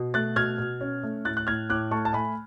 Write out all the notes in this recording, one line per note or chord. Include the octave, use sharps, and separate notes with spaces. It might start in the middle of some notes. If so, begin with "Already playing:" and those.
Already playing: B2
A3 F#6 A6
B2 F6 G#6
B2
C#4
A3
A2 F#6 A6
F#6
A2 F6 G#6
A2 D6 F#6
A3 A5 C#6
A5
A3 G#5 B5